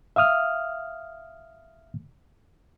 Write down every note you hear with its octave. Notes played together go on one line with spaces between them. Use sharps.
E5 F5 D#6 F6